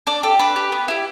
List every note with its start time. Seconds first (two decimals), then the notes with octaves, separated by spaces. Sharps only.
0.07 D4 D5
0.23 G4 A4
0.39 D4 B4
0.56 G4
0.72 B3
0.88 E4 G4